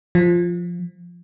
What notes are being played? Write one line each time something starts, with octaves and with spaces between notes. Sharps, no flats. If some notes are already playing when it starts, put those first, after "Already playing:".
F3